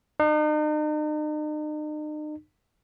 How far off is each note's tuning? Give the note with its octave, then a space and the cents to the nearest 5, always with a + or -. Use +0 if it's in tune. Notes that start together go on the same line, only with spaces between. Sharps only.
D#4 -40